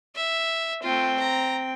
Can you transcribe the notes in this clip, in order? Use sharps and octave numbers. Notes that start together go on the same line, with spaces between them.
E5
A3 C4 F4 G5
A#5